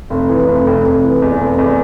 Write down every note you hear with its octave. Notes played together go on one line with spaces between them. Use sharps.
F1
E3
F1
F1
F1
E3
E2
F1
E2